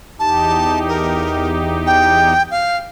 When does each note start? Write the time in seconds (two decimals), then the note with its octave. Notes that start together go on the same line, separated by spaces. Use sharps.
0.19 E2 D#4 G4 A5
0.89 A#4
1.87 G5
2.51 F5